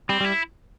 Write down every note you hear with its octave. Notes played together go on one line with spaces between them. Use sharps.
G3 C4
G3 E4